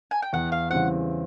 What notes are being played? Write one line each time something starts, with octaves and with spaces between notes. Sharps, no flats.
G#5
G5
E2 F#5
F5
C#3 E3 G3 C4 F#5